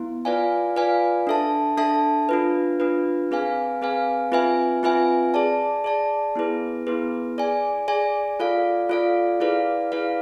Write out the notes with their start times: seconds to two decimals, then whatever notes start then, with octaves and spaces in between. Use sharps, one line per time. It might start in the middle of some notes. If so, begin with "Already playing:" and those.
Already playing: B3 E4
0.25 F4 B4 D5 F5 G#5
0.76 F4 B4 D5 F5 G#5
1.27 D4 A4 E5 A5
1.77 D4 A4 E5 A5
2.29 D4 F4 B4
2.80 D4 F4 B4
3.31 C4 G#4 B4 F5 G#5
3.82 C4 G#4 B4 F5 G#5
4.32 C4 F4 B4 E5 G#5
4.83 C4 F4 B4 E5 G#5
5.34 G#4 D5 A5
5.84 G#4 D5 A5
6.36 B3 E4 G#4 B4
6.87 B3 E4 G#4 B4
7.38 G#4 D5 G#5
7.88 G#4 D5 G#5
8.40 F4 A4 D5 F5
8.90 F4 A4 D5 F5
9.40 E4 G#4 B4 D5 F5
9.92 E4 G#4 B4 D5 F5